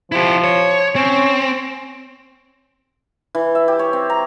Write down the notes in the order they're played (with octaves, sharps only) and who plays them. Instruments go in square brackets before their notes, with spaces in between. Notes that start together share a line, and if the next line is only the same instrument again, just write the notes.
[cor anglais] F3 [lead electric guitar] E4 G4
[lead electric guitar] C#5
[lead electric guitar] C4 [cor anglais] C#4
[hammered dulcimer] E3
E5
G4
C#5
C4
A#5